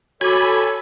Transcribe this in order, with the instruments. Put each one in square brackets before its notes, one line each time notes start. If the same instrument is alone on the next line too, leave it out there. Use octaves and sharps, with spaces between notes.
[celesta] F#4 D6 [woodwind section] A4 [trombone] C#5 [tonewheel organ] G#5 B5